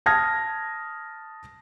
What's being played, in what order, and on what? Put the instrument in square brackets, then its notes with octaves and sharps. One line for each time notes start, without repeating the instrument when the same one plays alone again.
[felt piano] A5 D#6 F6 G#6 A#6